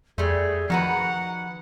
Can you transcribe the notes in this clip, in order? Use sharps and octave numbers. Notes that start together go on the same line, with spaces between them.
F2 G3 A3 G#4
D#3 F3 F#4 B4 F#5 A#5